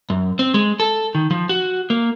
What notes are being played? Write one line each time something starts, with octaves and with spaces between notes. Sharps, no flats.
F#2
C4
G#3
A4
D#3
F3
F#4
A#3